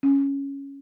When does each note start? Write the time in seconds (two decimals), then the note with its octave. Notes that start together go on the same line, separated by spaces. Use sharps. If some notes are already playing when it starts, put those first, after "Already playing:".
0.03 C#4